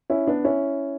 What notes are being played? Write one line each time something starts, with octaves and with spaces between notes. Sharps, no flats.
C#4 E4
B3 D4
C#4 E4